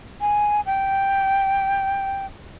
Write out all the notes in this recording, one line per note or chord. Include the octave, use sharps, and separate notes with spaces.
G#5
G5